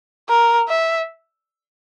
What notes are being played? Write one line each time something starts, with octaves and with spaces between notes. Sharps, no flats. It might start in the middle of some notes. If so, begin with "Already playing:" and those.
A#4
E5